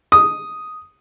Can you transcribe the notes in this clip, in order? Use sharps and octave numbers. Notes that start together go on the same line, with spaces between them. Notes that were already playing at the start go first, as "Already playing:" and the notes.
D#6